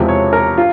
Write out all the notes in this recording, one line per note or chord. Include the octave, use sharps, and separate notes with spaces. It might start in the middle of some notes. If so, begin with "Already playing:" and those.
Already playing: E1 E2 C3 F3 G#3
C#5
A#4
F4